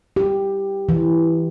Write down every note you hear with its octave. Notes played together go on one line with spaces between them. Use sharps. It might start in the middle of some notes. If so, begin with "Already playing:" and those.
G4
E3